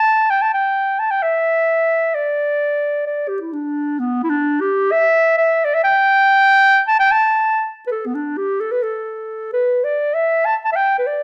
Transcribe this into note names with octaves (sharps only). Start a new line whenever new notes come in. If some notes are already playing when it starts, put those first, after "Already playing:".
Already playing: A5
G5
A5
G5
A5
G5
E5
D5
D5
G4
E4
D4
B3
E4
D4
G4
E5
E5
D5
E5
G5
A5
G5
A5
B4
A4
B3
D4
G4
A4
B4
A4
B4
D5
E5
A5
A5
E5
G5
B4
D5